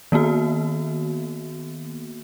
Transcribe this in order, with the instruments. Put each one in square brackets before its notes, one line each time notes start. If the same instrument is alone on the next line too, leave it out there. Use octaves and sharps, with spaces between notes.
[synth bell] D#3 A#3 B3 F#4